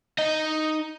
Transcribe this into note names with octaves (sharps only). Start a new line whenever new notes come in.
D#4 D#5